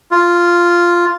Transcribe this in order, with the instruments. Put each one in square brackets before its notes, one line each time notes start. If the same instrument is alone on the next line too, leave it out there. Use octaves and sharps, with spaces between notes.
[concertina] F4